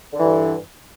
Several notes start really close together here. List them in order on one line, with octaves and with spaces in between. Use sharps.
D3 E3 G2